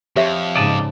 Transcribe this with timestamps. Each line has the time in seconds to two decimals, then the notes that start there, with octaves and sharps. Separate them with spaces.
0.16 F2 G4 C#5 E5
0.56 G#2 C#3 D5 D#5 A5